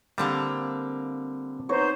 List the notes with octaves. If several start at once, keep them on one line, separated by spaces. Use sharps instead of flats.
D3 G3 A#3 C4 F4
B3 D#4 C5 C#5